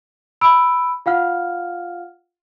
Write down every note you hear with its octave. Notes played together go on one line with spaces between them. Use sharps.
B5 E6 D7
F4 F5 F#5 F6